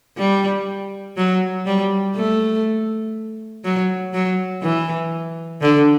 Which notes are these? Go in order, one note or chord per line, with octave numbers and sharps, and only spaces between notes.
G3
F#3
G3
A3
F#3
F#3
E3
D3